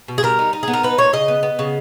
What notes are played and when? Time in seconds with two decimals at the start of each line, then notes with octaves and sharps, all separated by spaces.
0.08 B2
0.18 G#4
0.23 G3 A#4
0.39 D#4
0.53 D#4
0.63 G#4
0.68 B3
0.73 A#4
0.83 D#4 B4
0.98 A#2 C#5
1.13 C#3 D#5
1.28 B3
1.43 B3
1.59 C#3